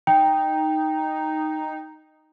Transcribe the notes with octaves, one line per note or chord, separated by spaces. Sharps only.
D#4 G5